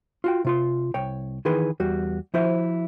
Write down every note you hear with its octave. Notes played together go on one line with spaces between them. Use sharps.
F4 F#4 G5
C3 F4 C6
C2 C#5 G5
D#3 E3 G#4 B4 C6
E2 G3 F#4
F3 E4 F#4 C5 C#5 E5